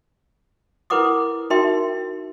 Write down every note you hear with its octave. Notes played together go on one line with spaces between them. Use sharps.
E4 A#4 B4 F#5 D6 D#6
D#4 F#4 A#4 E5 G5 C6